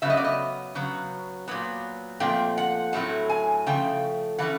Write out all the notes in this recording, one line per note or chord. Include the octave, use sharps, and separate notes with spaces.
C#3 F#3 B3 E5
D#5
D5
D#5
C#3 F#3 B3
A#2 F#3 B3
A#2 F3 A3 C4 G5
F#5
A2 F#3 A3 C4 F#5
G#5
C#3 F3 A3 G5
E3 A3 C#4 F#5